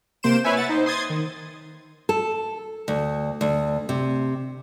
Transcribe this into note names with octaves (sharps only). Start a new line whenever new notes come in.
C3 A#3 C5 D7 E7
E4 B4 C#5 E5 G#5
E5 F#5 A6
D#4 C5
C6 D#6 G#6 A6
D#3
A4
D2
D2
C3